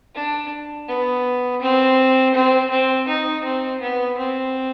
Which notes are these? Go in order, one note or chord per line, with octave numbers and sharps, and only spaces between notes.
D4
B3
C4
C4
C4
D#4
C4
B3
C4